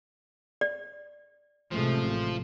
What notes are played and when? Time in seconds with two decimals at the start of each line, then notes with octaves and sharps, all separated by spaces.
0.61 D5
1.71 A1 C3 F3 G#3 A3